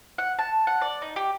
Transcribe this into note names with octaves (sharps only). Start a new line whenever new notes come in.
F#5
A5
F#5
D5
D#4
G4